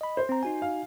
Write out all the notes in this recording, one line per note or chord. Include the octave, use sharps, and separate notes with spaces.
D#5 B5
C5
C4 A#5
D#4 F#4 G#5
F5